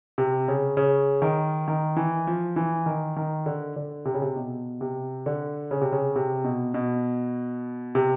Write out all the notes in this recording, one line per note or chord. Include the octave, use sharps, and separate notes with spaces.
C3
C#3
C#3
D#3
D#3
E3
F3
E3
D#3
D#3
D3
D3
C3
C#3
C3
B2
C3
D3
C#3
C3
C#3
C3
B2
B2
C3